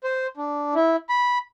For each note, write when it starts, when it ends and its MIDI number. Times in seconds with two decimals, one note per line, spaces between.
0.04 0.27 72
0.37 0.75 62
0.75 0.96 64
1.09 1.38 83